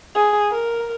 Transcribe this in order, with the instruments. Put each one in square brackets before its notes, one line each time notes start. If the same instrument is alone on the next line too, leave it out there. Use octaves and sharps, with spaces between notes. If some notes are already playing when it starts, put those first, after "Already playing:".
[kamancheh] G#4
A#4